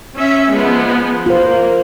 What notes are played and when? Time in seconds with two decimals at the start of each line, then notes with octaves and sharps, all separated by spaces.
0.15 C#4 E5
0.50 F3 G#3 B3
1.26 A#3 F4 C5